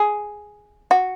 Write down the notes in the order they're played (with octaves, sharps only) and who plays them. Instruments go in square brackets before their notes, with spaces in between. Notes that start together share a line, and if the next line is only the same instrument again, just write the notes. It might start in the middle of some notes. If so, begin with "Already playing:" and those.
Already playing: [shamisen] G#4
F#4